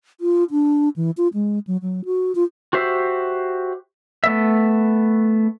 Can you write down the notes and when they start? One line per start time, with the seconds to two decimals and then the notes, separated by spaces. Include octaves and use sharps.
0.21 F4
0.51 D4
0.96 E3
1.17 F4
1.34 G#3
1.67 F#3
1.82 F#3
2.05 F#4
2.35 F4
2.73 F#4 G4 C5 E5
4.24 A3 B3 E5